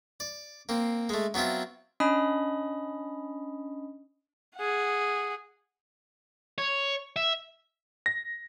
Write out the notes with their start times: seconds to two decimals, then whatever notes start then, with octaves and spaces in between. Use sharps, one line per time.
0.20 D5
0.69 A#3 C4
1.09 G#3 A3
1.34 F#3 B3 C4 E4 F4
2.00 C#4 D4 D#5 B5 D#6
4.56 G#4 F#5
6.58 C#5
7.16 E5
8.06 A#6